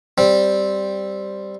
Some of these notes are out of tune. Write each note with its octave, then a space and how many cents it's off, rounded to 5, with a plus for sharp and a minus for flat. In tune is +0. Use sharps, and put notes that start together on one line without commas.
G3 +0 C4 +0